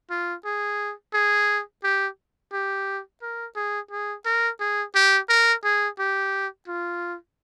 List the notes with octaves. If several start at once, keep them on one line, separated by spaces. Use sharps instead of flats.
F4
G#4
G#4
G4
G4
A#4
G#4
G#4
A#4
G#4
G4
A#4
G#4
G4
F4